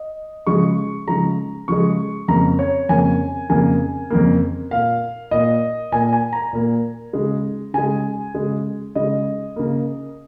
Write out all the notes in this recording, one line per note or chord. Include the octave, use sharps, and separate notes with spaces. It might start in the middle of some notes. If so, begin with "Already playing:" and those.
Already playing: D#5
C#3 F3 G#3 C#6
C#3 F3 G#3 A#5
C#3 F3 G#3 C#6
F2 C#3 A#3 A#5
C#5
F2 C#3 A#3 G#5
F2 C#3 A#3 G#5
F2 C#3 A#3
A#2 A#3 F5
A#2 A#3 D#5
A#2 A#3 G#5
G#5
A#5
A#2 A#3
C#3 G#3
C#3 G#3 G#5
C#3 G#3
C#3 G#3 D#5
C#3 A#3